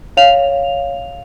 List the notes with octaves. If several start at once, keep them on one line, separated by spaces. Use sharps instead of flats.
C#5 F5 F7